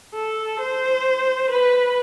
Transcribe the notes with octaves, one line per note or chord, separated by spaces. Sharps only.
A4
C5
B4